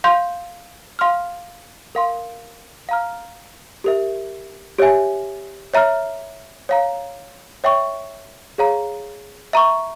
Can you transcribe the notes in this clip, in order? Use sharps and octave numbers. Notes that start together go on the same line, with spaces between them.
F5 C6 G6
F5 C6 F6
A#4 F5 C6
F5 A#5 F6
G4 A#4 E5
G4 C#5 E5 G#5
C#5 E5 A#5 F6
C#5 F5 A#5
C#5 E5 G5 C#6
G#4 C#5 F5 A#5
E5 A#5 C#6